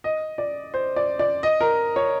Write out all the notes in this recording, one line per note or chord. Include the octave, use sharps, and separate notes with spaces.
D#5
D5
C5
D5
D5
D#5
A#4
C#5